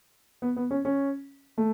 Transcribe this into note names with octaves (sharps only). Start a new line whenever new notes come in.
B3
B3
C#4
C#4
A3